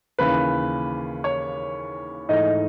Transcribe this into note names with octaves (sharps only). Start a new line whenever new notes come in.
D#2 C#3 E3 B4
C#5
G#2 E3 A3 D#4 D#5